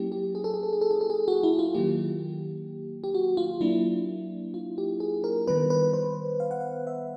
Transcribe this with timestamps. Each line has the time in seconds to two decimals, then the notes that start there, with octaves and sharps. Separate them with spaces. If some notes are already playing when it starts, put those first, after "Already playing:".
Already playing: F#3 A#3 C#4 E4 G4
0.12 G4
0.35 G#4
0.44 A4
0.54 G#4
0.63 A4
0.73 G#4
0.81 A4
0.91 G#4
1.01 A4
1.10 G#4
1.28 F#4
1.43 E4
1.59 F4
1.74 D#3 F#3 A#3 G4
3.04 G4
3.14 F#4
3.37 F4
3.61 F#3 A#3 D4 E4
4.54 F4
4.78 G4
5.00 G#4
5.24 A#4
5.47 D#3 G3 B3 B4
5.70 B4
5.93 C5
6.40 F5
6.51 F#5
6.61 F5
6.87 E5